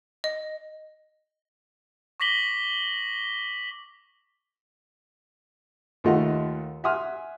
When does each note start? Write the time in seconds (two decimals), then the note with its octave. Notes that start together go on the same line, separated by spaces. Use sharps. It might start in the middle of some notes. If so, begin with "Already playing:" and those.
0.24 D#5
2.20 C#6 D6 A#6 B6 F#7 G7
6.04 D#2 A3 F4 D#5 F#5
6.84 E5 F#5 G#5 C6 D#6 F6